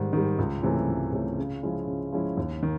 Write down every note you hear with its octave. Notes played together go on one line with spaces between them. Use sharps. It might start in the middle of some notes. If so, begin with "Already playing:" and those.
Already playing: G#2 D#3 G3
D#3 G3
C#2
C3 E3 A3 C#4
C#2
C3 E3 A3 C#4
C#3
F3 G#3 C#4 E4
C#3
F3 G#3 C#4 E4
D#2
D#3